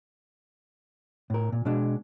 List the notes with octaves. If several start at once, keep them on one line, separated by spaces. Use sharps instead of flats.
A2 A#4
A#2
B2 G#3 D4